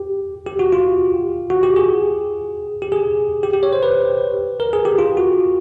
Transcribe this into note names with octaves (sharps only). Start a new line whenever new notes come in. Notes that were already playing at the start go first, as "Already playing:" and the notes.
Already playing: G4
G4
F#4
F4
F#4
G4
G#4
G4
G#4
G4
G4
C#5
C5
B4
A#4
G#4
G4
F4
F#4